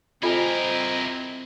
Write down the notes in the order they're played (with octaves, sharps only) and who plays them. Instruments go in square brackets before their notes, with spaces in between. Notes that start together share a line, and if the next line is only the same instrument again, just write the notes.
[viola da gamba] C4 [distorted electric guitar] E4 A#4 [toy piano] F4 A4 G#5 [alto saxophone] D#5